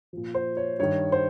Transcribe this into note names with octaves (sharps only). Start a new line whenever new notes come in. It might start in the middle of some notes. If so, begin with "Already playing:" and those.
A#2 F3
C5
C#5
G2 D#3 C#5
C5